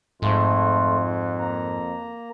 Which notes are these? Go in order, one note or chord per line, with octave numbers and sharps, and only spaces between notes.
F2 G#2 A3 F4
A#3 A#5